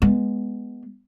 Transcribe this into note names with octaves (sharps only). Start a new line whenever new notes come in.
G#3 B3